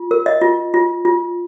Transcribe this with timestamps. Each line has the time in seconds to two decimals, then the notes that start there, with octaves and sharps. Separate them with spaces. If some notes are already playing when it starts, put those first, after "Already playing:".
Already playing: F4
0.11 A#4
0.26 D#5
0.41 F4
0.74 F4
1.05 F4